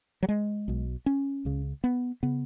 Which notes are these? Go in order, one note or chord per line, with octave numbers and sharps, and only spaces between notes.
F#3
G#3
B1 B2
C#4
C#2 C#3
B3
C#3 B3